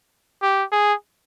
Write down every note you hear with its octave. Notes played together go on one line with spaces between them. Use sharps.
G4
G#4